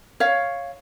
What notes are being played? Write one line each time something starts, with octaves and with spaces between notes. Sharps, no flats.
C#5 F5